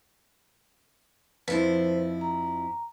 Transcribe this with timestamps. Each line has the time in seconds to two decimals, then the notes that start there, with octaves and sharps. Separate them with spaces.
1.48 F2 F3 E4 B4 C5
2.21 A#5